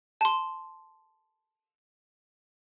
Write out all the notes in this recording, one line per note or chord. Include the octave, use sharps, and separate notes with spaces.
A5 C6